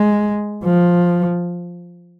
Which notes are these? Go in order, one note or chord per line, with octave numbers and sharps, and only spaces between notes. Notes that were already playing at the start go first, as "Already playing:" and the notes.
Already playing: G#3
F3